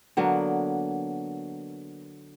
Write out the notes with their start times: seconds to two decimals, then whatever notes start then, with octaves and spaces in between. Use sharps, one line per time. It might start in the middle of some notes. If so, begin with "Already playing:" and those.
0.17 D3 F#3 A#3 B3